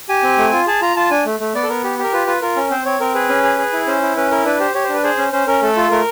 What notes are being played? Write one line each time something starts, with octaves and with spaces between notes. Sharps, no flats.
G4 G#5
C4
A3
F4
G#4 A5
F4 A#5
F4 A5
D4 G#5
A3
A3
B3 D5
A4
B3 A#4
G4
G4 A#4
F4 B4
F4 B4
F4 A#4
C#4
C4 C5
C4 C#5
C4 A#4
G#4 B4
C#4
G#4
G#4
E4
C#4 C5
E4
C#4 B4
E4 A#4
D4 B4
G4 C5
G4 C#5
C5
D4 B4
G#4 C5
C#4
C#4 C5
C#4 A#4
A3 A4
F4
A3 A#4